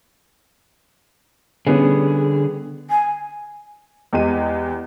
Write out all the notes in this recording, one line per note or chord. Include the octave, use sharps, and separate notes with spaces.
D3 G3 B3 C#4 G#4
G#5
E2 G#3 G4 D#7